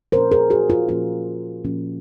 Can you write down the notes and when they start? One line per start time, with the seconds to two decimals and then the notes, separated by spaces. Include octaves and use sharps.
0.12 A#2 F3 A#3 C#4 A#4 C5
0.31 G#4 A#4
0.50 F#4 G#4
0.70 F4
0.89 A#2 F3 A#3 C#4 F4
1.64 A#2 F3 A#3 C#4